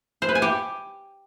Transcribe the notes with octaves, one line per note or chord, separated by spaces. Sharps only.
C5
B4
G#5
G4